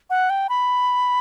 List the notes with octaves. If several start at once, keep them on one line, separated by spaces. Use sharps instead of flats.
F#5
G5
B5